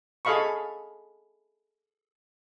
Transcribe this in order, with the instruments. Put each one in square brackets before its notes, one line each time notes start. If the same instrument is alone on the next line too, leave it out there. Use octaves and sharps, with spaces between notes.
[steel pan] G#4 A4 D#5 F5 B5 C#6